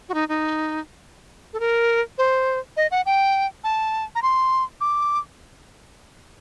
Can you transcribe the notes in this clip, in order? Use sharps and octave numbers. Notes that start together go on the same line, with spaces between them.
F#4
D#4
D#4
A4
A#4
C5
D#5
F#5
G5
A5
A#5
C6
D6